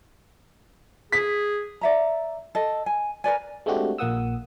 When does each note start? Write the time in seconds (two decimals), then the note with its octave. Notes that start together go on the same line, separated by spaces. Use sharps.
1.12 G#4 B6
1.81 D5 E5 A#5
2.55 A4 D#5
2.86 G#5
3.24 A#4 B4 D5 G#5
3.66 G#3 A3 C4 D4 F#4 G4
3.98 A#1 A#2 A#3 F#5 D#6 E6